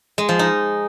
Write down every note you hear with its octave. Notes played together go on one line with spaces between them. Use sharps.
G#3
F3
D#4